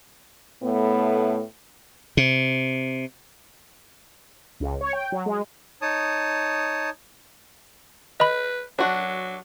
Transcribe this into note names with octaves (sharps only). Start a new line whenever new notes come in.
A2 A3 B3
C3
C#2
C#5
G5
F#3
G#3
D#4 C#5 A5 D#6
B4 D#5 B5
F#3 D4 F#4